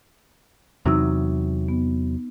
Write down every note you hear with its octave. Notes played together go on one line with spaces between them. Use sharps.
E2 C3 F#3 D#4 E6
B3